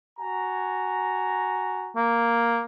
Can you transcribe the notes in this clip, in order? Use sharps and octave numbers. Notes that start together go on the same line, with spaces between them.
F#4 G#5 A#5
A#3